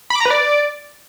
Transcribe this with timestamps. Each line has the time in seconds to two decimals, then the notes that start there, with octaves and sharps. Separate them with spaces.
0.10 B5
0.15 D6
0.20 A#5
0.25 B4
0.30 D5